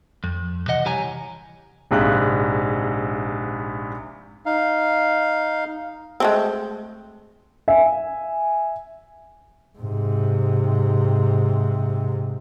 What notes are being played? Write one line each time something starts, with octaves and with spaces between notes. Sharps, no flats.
F2
C3 E3 D#5 F#5
C2 E3 G4 C#5 G#5 A#5
A#1 G#2 C3 F5 F#6
D#4 F5
G#3 A3 C4
E5 G#5
G#2 C3